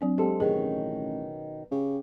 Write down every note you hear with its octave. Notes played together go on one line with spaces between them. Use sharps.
F#3 C4 D4
G#3 C4 G4 A4
A1 B2 D#3 C#4 G#4
C#3 G4